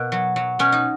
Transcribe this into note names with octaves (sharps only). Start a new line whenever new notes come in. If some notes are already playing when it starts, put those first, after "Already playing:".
Already playing: B2 A#3
F#3
F#3
B2 C#4
D#4